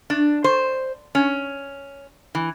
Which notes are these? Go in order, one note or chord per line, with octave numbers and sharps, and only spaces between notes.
D4
C5
C#4
E3